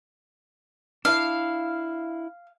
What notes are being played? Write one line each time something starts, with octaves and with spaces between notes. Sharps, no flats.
D4 E4 F5